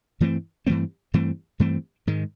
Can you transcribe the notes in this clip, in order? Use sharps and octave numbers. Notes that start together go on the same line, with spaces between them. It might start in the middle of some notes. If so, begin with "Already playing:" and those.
G2 E3 A3 C4
G2 E3 A3 C4
G2 E3 A3 C4
G2 E3 A3 C4
G#2 D#3 G#3